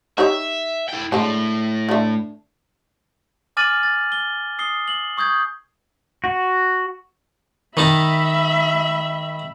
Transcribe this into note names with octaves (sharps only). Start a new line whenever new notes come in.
D#4 G4 C#5 E5
E4 G5
A2 G#3 D4
D3 A3
G#5 D6 F6 A6 D#7 F#7
A6
G7
D#6 C7 G7
F#7
C#6 D#6 G6 G#6
F#4
D#3 D#4 E5 A5 B5